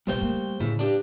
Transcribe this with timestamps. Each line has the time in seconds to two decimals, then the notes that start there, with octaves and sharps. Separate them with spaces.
0.07 A#1 B2 G3 C5 G5
0.21 A3 A#3
0.60 A2 C#3 E4
0.79 D4 G4